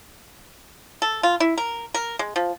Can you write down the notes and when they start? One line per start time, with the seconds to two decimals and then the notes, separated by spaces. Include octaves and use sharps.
1.02 A4
1.23 F4
1.40 E4
1.58 A#4
1.94 A#4
2.19 G#3
2.36 F3